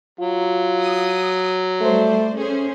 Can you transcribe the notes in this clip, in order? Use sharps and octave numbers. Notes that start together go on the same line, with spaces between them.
F#3 F4
D#6
G3 A3 C5 D5
C#4 G#4 C5